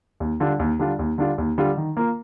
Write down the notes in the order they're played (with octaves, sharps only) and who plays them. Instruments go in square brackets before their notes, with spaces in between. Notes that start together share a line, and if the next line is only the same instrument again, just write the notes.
[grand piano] D#2
D3 G3 D4 F4
D#2
D3 G3 D4 F4
D#2
D3 G3 D4 F4
D#2
D3 G3 D4 F4
D#3
A#3 F4 A#4